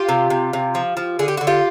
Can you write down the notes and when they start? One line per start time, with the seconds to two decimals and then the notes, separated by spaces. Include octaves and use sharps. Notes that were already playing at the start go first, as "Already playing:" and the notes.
Already playing: F4 G4
0.09 C3
0.30 C3
0.53 C3
0.75 F3
0.97 F3
1.19 D3 G#4
1.28 G4
1.37 D3 F#4
1.47 F4 G4